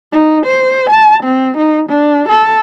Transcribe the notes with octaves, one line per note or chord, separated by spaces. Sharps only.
D#4
C5
A5
C4
D#4
D4
A4